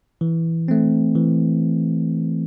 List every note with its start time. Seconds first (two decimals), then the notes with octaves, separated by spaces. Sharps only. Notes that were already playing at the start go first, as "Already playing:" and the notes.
0.21 E3
0.68 A3 C4
1.15 E3